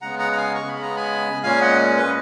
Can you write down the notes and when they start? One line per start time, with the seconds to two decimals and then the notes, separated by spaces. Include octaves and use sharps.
0.02 C#3 G#3 B3 F#5 A#5
0.19 F#5 A#5
0.32 A#5
0.37 F5 G#5
0.55 C#6
0.69 C#3 G#3 B3 B5
0.82 A#5
0.96 G#5 B5
1.43 A#2 G#3 C#4 F5 G#5
1.61 D#5 F#5
1.97 B4 D#5